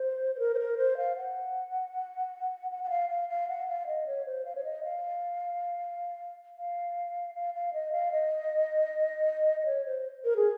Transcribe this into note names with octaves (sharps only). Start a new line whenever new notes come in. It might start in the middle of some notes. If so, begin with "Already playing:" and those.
Already playing: C5
C5
A#4
C5
A#4
C5
F5
F#5
F#5
F#5
F5
F5
F5
F#5
F5
D#5
C#5
C5
F5
C#5
D#5
F5
F5
F5
F5
D#5
F5
D#5
D#5
C#5
C5
A#4
G#4